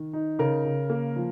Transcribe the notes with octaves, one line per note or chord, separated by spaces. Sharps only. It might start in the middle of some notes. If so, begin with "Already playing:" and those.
Already playing: D#3
D#4
C#3 A#4
C#3
A#3
F3